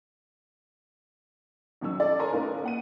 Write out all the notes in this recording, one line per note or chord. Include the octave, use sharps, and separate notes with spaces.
A1 D#3 F#3 C#4 E6
A4 D5
A4 A#4 C#5 G#5 A#5 C6
A3 C#4 D#4 A#4 B4 F5
A#3 F#5 D#7